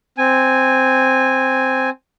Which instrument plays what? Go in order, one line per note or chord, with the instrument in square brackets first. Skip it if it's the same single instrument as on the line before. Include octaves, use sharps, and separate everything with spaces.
[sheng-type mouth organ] C4 G#5